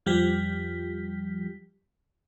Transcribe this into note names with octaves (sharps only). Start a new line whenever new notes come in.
F2 F3 G3 G4 B6